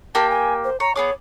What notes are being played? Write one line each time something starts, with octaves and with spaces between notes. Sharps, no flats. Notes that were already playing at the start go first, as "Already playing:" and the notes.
A#3 G4 G5 A5
G#5
C5
C#5 A#5
B3 G#4 C#5 D6